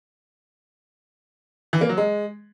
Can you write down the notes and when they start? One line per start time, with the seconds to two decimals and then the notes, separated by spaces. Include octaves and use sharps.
1.73 E3
1.81 A#3
1.89 F#3
1.97 G#3